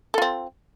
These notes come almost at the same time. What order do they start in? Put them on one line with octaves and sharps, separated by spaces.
A4 F4 C4